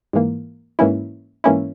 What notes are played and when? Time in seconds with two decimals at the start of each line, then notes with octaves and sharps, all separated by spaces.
0.13 G#2 E3 A#3
0.79 G#2 E3 A#3 C#4 E4
1.44 G#2 E3 A#3 C#4 E4